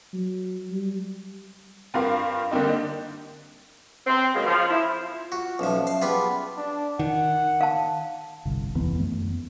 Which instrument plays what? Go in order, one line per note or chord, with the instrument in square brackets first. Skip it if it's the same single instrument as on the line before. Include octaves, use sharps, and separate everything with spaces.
[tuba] F#3
G3
[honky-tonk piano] G2 C4 F4 A#4 F5
D3 G3 A#3 C4 D#4
[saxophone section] C4
C#3 F#3 G#3 A#3 B3
F3
E4
[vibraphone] F4
[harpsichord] F#4
[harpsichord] B1 F3 [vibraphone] C#4 E5 A5
[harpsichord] F5
[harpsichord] G3 B3 F4 [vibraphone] G#4 F#5 B5
[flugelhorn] D4
[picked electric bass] D#3 [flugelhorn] F#5
[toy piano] F5 A5
[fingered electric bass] G1 C2
F1 D#2 E3 B3
F#2 A3 B3